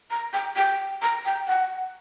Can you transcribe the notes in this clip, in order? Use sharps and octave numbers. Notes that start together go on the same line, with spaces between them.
A#5
G5
G5
A#5
G5
F#5